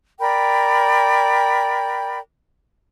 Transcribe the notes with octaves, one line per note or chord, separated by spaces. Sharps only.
A#4 D5 G5 B5